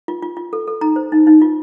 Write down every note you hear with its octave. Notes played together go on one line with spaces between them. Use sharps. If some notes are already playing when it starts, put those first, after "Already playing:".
F4
F4
F4
A4
A4
D#4 A#5
C5
D#4
D#4
F4